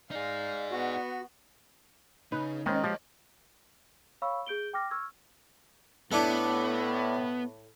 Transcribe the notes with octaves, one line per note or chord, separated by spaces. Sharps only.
D#4 G#4 D5 F5
B3 F#4
C#3 D#4 B4
D#3 G#3 C4 C#4 C#5 D#5
F3 G4
C#5 F5 B5 C#6 E6
G#4 G6 D7 G7
G5 D6 F6 A#6
C#6 E6 F6 G#6
A2 B3 D4 E4 A4